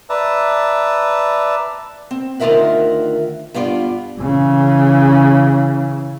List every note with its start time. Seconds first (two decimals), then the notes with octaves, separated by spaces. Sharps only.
0.10 B4 D5 E5 A5 A#5
2.11 C4
2.40 D2 D#3 F4 A#4 E5 F#5
3.54 G2 B3 F4 D5
4.19 C#3 E3